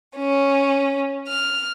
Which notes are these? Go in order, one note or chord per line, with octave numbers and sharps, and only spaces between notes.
C#4
F6